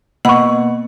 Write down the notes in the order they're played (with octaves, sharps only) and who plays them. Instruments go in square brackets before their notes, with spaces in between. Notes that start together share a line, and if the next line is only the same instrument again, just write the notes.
[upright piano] B2 C#6 [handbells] A#3 [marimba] F#5 B5